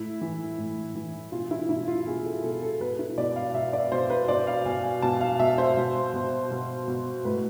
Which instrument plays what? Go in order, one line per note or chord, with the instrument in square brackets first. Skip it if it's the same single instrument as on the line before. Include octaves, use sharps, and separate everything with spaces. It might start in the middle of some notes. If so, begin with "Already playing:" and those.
Already playing: [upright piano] A2 E4
E3
A2
E3
B2 F4
E4
B2 E4
F4
B2 G#4
A4
B2 A4
A4
B2 B4
E4
B2 D5
F5
B2 E5
D5
B2 C5
B4
B2 D5
F5
B2 G#5
B2 A5
F5
B2 E5
C5
B2
B2
B2
B2
A2 B4